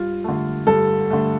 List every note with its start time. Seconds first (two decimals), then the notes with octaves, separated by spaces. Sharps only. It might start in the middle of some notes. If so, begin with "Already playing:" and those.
Already playing: G2 F4
0.24 D3 A3
0.67 G2 A4
1.10 D3 A3